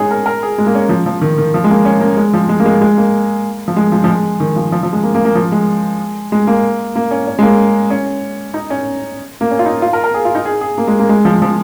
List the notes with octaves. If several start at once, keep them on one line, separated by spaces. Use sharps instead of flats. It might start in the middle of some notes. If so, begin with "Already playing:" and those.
Already playing: G#3 C#4 D#4 G#4
A#4
A#4
G#4
G#3
A#3
C#4
F3
F3
D#3
D#3
F3
G#3
A#3
C#4
A#3
G#3
F3
G#3
A#3
G#3
G#3
A#3
F3
G#3
F3
F3
G#3
D#3
F3
F3
F3
G#3
A#3
A#3
A#3
F3
G#3
G#3
A#3
A#3
C#4
C#4
G#3
A#3
C#4
D#4
C#4
A#3
C#4
F4
D#4
F4
A#4
A#4
G#4
F4
D#4
G#4
G#4
A#3
G#3
A#3
G#3
F3
F3